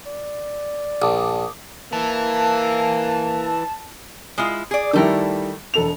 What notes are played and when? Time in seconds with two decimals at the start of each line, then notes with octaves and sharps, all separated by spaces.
0.06 D5
1.02 A#1 A5 D6 D#6
1.93 E3 A#3 A5
4.38 G#3 E4 F4
4.71 G#4 D5
4.93 D#3 G3 A3 E4 A4 A#4
5.74 E1 A4 F7